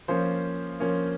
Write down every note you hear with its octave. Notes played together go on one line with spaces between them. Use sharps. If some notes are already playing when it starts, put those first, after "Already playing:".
F3 A#3 C#4 C5
F3 A#3 C#4